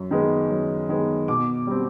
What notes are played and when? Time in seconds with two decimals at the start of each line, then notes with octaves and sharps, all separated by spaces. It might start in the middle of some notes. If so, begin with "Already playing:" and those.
Already playing: F#2
0.11 D#3 G#3 B3
0.50 F#2
0.89 D#3 G#3 B3
1.28 B2 D6
1.67 G3 C4